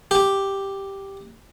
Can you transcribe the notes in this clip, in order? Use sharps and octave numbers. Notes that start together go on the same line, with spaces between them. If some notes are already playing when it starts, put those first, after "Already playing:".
G4